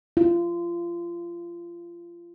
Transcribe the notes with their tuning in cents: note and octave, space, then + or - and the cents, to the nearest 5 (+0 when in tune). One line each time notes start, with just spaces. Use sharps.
F4 -25